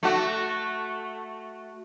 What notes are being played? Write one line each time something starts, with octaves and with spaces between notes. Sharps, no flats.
A3 F#4